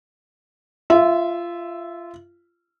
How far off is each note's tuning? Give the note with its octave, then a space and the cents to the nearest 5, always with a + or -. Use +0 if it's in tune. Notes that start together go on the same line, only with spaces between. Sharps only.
F4 -20 E5 +0